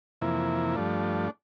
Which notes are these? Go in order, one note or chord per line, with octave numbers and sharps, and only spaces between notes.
F2 C3 E3 A#3 E4
G2 F3 A3 D4